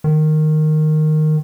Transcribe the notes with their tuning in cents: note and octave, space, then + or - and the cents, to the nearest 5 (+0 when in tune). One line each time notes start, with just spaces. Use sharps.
D#3 -10